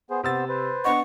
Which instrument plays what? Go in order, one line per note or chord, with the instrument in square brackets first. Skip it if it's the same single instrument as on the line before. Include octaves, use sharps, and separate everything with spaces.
[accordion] B3 G#4 C5
[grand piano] C3 E6 A6 [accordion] B3 C5
[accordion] B4 C5
[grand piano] B3 D4 D#5 [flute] F#5 [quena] C#6